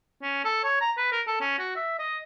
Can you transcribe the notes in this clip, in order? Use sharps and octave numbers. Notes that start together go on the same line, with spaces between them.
C#4
A4
C#5
A#5
B4
A#4
A4
C#4
F#4
E5
D#5